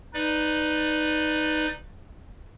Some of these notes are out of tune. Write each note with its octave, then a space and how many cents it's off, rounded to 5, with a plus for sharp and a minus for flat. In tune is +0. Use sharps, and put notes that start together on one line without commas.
D#4 +0 B4 +5 D5 +15